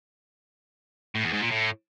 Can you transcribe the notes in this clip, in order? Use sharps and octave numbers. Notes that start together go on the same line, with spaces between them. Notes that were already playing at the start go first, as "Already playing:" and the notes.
A2
E2
G#2
A#2
A2